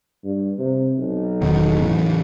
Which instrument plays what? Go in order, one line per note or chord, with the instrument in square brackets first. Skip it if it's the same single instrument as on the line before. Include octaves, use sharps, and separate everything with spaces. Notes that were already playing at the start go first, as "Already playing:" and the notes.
[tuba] G2
C3
B1
[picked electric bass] E1 B2 D#3
A2 C#3 E3